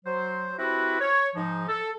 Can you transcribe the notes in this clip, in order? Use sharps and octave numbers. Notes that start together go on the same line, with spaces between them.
F#3 C5
C4 E4 F#4 G4 B4
C#5
G#2 F3 D#4
A4